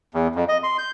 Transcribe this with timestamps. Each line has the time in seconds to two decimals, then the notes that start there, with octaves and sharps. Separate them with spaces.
0.14 E2
0.35 F2
0.49 D#5
0.63 C6
0.78 G6